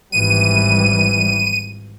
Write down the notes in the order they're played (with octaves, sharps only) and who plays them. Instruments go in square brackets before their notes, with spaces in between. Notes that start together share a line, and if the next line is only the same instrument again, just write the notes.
[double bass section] G#1 E3 G3 [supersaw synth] D#7